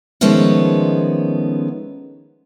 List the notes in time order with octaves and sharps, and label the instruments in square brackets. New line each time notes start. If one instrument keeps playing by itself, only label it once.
[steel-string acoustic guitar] D#3 F3 G#3 A3 B3 C#4